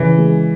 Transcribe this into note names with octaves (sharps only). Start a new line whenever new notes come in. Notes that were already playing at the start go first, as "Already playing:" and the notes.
Already playing: C#3 E3
G#3